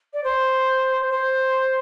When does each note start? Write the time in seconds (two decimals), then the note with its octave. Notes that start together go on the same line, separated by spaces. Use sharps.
0.13 D5
0.24 C5
1.10 C5